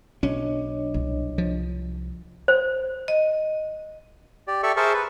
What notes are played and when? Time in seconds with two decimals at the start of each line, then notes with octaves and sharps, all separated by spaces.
0.23 B1 F#3 C#4 D4 C#5 D#5
0.94 C2
1.38 F3
2.48 C5
3.08 D#5
4.48 G4 D5
4.63 G4 A4 D5 E5 C#6
4.77 G#4 A#4 C5 E5 A5 C#6
4.94 B4